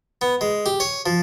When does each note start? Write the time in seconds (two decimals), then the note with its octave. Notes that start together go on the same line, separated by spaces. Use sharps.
0.21 B3
0.41 G#3
0.66 G4
0.80 C#5
1.06 F3